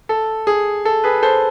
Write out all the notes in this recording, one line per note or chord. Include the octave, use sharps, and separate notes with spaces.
A4
G#4
A4
G#4 B4
A4 C5